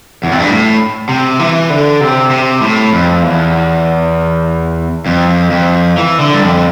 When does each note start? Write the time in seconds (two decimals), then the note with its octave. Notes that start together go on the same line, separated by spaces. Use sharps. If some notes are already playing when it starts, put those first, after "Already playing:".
0.24 E2
0.32 F2
0.40 G2
0.49 A2
1.09 C3
1.39 E3
1.70 D3
2.01 C3
2.30 C3
2.62 A2
2.93 F2
3.22 E2
5.06 F2
5.51 F2
5.97 E3
6.20 D3
6.34 G2
6.43 F2